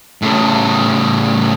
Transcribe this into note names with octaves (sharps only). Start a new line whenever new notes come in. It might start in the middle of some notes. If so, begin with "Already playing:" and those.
A2 C#3